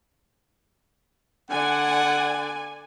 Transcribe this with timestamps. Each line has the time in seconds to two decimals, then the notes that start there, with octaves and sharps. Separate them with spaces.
1.51 D3 D5 F#5 G#5